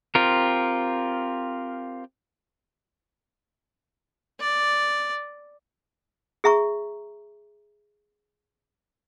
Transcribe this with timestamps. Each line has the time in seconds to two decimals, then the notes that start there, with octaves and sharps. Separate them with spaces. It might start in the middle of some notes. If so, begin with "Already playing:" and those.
0.15 C4 F4 G4 A#4
4.40 D5
6.44 G#4 E5 A#5 C#6